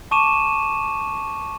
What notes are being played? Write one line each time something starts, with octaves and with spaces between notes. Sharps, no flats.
A5 C#6 D6 D#7 E7